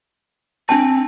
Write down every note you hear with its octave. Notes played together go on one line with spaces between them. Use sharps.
C4 D4 G5 A5